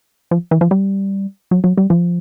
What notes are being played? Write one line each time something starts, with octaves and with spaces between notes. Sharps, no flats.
F3
E3
F3
G3
F#3
F#3
G3
F3